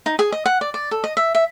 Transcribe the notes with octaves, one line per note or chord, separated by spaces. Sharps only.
D#4
G#4
D#5
F#5
D5
D5
A4
D#5
E5
E5